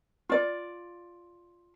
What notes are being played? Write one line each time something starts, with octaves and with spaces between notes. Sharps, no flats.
F4 D5